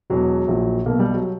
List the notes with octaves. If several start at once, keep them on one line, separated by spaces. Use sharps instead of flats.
E1 E2 B2 F#3
A#1 A#2
B1 B2 A#3
G3
F#3